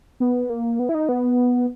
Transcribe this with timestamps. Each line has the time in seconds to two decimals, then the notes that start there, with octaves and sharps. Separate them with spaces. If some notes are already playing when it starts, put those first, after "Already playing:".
0.20 B3
0.50 A#3
0.79 B3
0.89 E4
0.95 D#4
1.09 B3